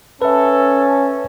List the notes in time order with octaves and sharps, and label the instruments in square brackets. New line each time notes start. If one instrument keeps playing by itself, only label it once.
[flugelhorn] C#4 [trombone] A4 [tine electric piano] B4 E5